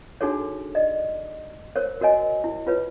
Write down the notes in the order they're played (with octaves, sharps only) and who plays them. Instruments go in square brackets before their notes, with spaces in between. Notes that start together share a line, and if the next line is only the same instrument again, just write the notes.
[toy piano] D4 D#4 F#4 G#4 A4 C#5
D5 D#5
A#4 C5 C#5
F#4 A#4 C#5 D#5 G#5
E4
F4 B4 C#5